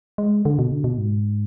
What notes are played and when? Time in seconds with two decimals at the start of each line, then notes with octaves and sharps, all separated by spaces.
0.18 G#3
0.45 D3
0.59 B2
0.72 D3
0.84 B2
0.98 G#2